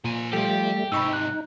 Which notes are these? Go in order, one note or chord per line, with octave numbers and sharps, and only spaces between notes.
A#2 F3 G#5
F3 G3 A3 G4 A4
G#2 C3 D#4 B5 C#6 E6
F#6